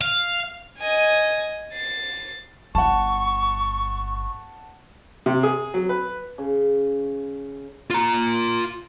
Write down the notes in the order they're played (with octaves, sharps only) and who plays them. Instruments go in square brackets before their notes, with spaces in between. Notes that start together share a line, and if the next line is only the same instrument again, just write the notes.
[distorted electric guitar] F5
[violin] D#5 G#5
A6 C7
[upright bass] G1 E4 [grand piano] F#5 A5 [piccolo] C#6
[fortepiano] C3
G#4
F#3
B4
[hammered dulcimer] C#3
[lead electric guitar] F4 A#5